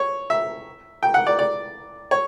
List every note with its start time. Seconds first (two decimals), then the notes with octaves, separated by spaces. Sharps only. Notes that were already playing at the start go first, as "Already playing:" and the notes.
Already playing: C#5
0.30 E5
1.03 G5
1.14 F#5
1.27 D5
1.39 D5
2.11 C#5